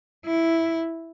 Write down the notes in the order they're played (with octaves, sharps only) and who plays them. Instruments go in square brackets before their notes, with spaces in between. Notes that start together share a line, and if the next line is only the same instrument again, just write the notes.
[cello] E4